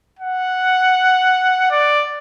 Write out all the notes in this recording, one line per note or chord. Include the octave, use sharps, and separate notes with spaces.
F#5
D5